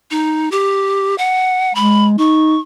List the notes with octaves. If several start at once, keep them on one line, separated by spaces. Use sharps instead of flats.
D#4
G4
F#5
G#3 B5
D#4 C#6